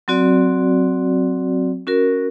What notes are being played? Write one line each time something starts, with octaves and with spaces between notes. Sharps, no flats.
F#3 C4 F#4 D5
C#4 F#4 A#4